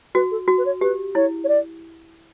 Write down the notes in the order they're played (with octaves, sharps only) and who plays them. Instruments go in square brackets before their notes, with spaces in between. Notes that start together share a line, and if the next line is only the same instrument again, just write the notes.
[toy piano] F#4 [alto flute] B4
[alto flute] A4
[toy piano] F#4
[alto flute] B4
C#5
[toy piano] G4 [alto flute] B4
[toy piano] E4 [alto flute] C#5
[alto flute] C#5
D5